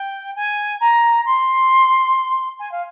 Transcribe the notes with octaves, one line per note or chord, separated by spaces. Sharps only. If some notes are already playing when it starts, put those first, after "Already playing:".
Already playing: G5
G#5
A#5
C6
G#5
F5